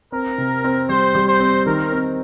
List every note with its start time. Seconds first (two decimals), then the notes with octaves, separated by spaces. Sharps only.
0.12 C4 A#4
0.38 C3
0.64 C4
0.89 G3 C5
1.15 G3
1.28 C5
1.40 C4
1.65 D#3 A#4
1.92 C4